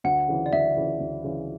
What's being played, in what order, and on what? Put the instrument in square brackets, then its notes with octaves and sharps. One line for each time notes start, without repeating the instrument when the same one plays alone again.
[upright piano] D2 [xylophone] F#5
[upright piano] C#3 E3
[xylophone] D5
[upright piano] D2 [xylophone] E5
[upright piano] C#3 E3
D2
C#3 E3